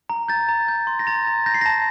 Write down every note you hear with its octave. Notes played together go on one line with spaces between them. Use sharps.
A#5
G6 A6
A#5
G6
C6
A#6
A#5 A6
A#5
G6 A#6
C7
A5 A#6